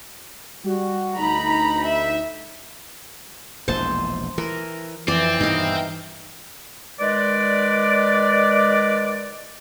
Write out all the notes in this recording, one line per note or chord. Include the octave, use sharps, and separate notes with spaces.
G3 F#4
D2 D#4 A#5 B5
E5
E1 A#1 E3 C5 A5
E3 A#4
F2 E3 C4 D5
G2 B2 D#3 D#4 F5
D#3 G#3 B4 D5